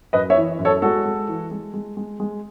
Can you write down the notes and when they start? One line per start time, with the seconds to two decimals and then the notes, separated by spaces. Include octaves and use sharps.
0.13 F#2 B4 D#5
0.30 C#5 E5
0.37 E3
0.59 F#2
0.65 A4 C#5
0.82 G#3 F#4 A4
1.05 G#3
1.28 E3
1.51 G#3
1.74 G#3
1.97 G#3
2.20 G#3